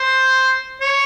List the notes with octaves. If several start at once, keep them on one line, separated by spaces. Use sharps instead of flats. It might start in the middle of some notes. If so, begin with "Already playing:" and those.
Already playing: C5
C#5